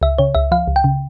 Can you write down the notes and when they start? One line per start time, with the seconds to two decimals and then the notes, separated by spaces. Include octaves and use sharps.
0.02 C#2 E5
0.18 C#3 C#5
0.35 C#2 E5
0.52 F3 F5
0.67 C#2
0.76 G5
0.84 C#3